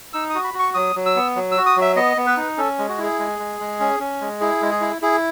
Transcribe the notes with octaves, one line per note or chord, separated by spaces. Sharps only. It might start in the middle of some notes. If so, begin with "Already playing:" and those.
D#4 E6
D#6
F#4
B5
F#4
C#6
F#3 D#6
F#3
E6
B3
F#3
E6
F#4
D#6
F#3
E5
B3 D#5
B3
B4
D#4
C#4 A4
G#3
F#4
E4 G#4
G#3
G#3
G#3
C#4
C#4
G#3
E4 G#4
G#3
G#4
E4
E4 G#4